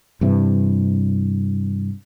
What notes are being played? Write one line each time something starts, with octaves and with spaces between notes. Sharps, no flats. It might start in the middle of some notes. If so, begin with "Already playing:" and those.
G2 C3 E3